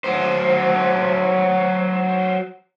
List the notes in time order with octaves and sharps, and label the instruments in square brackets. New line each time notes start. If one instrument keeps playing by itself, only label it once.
[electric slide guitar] F#3 C5